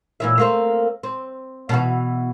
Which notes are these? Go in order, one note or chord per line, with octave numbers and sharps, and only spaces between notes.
A#2 E3 E5
A3 A#3 C4
C4
B2 E3 F#4